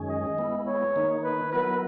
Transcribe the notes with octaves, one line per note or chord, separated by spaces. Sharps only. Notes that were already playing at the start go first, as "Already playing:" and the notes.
Already playing: F#2 D#3 G#3 C#4 G#4
D#5
G#3 B3 E4
C#5
D#3 A#3 D#4
B4
F#3 B3 E4 A#4 B4